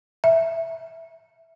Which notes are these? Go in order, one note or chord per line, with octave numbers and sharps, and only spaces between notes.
E5